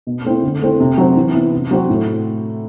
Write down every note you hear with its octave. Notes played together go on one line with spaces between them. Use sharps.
B2
A3 C4 E4
D3
A3 C4 E4
C3
F#3 C4
E3
B3 E4
C3
F#3 C4 F#4
A2